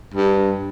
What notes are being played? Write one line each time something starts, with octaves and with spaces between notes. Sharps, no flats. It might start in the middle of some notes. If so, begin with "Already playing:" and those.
G2